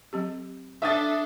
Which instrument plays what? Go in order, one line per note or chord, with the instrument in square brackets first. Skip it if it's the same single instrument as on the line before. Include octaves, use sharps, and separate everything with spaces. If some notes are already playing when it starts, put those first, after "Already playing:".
[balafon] F#3 C4 G4
[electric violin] D4 A4 [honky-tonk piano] E5 D#6 A6